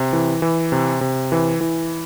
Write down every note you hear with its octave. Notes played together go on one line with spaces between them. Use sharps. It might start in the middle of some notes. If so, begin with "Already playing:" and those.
Already playing: C3
E3
E3
C3
C3
E3
E3